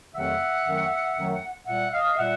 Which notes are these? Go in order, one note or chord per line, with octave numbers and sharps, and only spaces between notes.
F2 C3 D#3 F#3 A3 E5 F#5
F#2 D#3 F#3 A3
F#2 D#3 F#3 A3
A#2 G3 E5 F#5
D#5 F5
A#2 G3 E5 F#5